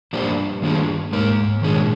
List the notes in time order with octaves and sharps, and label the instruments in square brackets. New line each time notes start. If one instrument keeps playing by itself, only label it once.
[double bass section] G2 [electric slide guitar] F3 A#3 D4 G4 C5
[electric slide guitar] D#3 A#3 D4 F4 G#4
[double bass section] G#2 [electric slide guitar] A#3 D#4 A#4
[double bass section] A#2 [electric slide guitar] D#3 G#3 D4 G#4